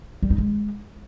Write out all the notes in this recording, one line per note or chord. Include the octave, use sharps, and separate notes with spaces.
G3
D#4
G#3